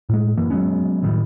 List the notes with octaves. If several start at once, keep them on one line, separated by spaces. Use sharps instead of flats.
A2 G#3
F#2 E3 A#3
F#3 G#3 B3 C#4
F#1 A2 D#3 G3